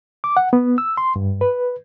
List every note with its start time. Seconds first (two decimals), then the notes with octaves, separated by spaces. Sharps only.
0.24 D6
0.37 F#5
0.53 B3
0.78 E6
0.97 C6
1.16 G2
1.41 B4